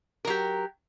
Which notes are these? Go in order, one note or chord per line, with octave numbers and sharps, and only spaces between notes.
F#3 G4 A#4